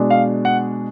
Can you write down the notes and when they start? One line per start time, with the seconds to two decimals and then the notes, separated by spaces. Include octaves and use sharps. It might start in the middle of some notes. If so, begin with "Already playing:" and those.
Already playing: B2 G#3 D4
0.10 F5
0.45 F#5